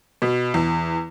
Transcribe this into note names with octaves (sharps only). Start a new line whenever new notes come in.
B2
E2